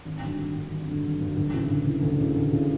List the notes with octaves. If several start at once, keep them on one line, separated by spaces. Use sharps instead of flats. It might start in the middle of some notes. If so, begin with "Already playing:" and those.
G#1
G2 D3 F#3
G#1
G2 D3 F#3
G#1
G2 D3 F#3
G#1
G2 D3 F#3
D2
C#3 E3
D2
C#3 E3
D2
C#3 E3
D2
C#3 E3